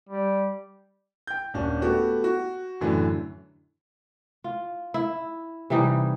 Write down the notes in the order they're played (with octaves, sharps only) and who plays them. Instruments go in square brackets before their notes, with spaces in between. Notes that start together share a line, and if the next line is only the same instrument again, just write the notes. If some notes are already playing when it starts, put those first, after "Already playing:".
[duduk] G3
[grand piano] G5 G6
D#1 C#4 D4
A3 B3 F#4 G4
F#4
F#2 A2 D3 E3
[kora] F4
E4
C3 E3 G3 D#4